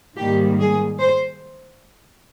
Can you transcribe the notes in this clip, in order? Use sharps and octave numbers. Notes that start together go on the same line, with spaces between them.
G#2 D#3 G3 A#3 G4
G#4
C5